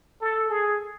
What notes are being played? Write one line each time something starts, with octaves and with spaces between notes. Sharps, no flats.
A4
G#4